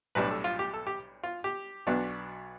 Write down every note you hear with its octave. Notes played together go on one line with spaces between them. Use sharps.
B1 A2 G3 D4 B4
A4
F4
G4
A4
G4
F4
G4
B1 B2 B3 D4